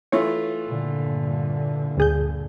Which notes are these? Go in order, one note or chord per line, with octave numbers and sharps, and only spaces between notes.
E3 A3 F4 C#5
G2 A#2 D3
D2 G#4 G6